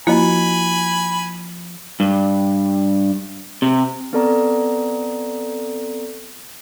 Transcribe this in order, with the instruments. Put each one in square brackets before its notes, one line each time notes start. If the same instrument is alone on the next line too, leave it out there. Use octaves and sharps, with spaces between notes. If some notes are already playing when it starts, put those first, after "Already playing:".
[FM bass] F3 [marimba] A#3 F#4 [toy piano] E4 D#5 [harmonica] G#5 B5
[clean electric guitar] G2
C3
[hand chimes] B3 C4 A4 D5 A#5